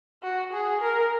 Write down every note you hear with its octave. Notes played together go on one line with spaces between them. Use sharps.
F#4
G#4
A#4